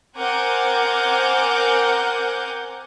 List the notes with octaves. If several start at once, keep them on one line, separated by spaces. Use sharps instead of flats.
C4 A#4 F#5 G#5 D6 G6